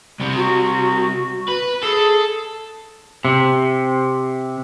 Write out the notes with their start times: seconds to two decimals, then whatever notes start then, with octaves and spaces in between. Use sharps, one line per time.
0.20 C2 C3
0.36 F#4
1.49 B4
1.83 G#4 A4
3.25 C3